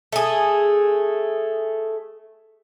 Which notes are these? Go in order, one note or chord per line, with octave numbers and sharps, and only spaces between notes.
A3 G#4